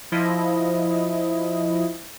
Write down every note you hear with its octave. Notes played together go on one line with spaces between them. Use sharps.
F3 E4 D#5